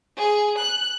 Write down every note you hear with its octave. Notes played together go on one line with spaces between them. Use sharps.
G#4
F#6